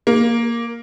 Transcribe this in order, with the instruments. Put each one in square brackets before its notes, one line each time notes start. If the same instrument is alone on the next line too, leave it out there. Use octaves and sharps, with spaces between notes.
[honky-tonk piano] A#3